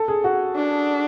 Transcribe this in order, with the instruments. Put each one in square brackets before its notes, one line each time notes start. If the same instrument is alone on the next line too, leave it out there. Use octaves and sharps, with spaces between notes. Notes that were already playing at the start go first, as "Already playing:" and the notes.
Already playing: [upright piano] A4
G#4
F#4
[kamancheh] D4